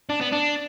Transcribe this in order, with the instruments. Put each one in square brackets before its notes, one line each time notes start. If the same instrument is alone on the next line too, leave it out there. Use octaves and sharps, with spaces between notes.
[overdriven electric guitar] D4
B3
D4